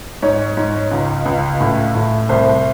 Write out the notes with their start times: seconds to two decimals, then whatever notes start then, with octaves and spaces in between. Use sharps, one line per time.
0.22 G#2 C#5
0.57 G#2
0.91 C#2
1.26 C#2
1.61 A2
1.95 A2
2.29 C2 C5